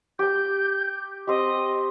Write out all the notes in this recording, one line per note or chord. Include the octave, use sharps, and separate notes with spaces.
G4 D6 G6
C4 G4 D#5